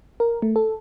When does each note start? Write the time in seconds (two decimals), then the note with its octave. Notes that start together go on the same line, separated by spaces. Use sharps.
0.20 A#4
0.42 A3
0.56 A4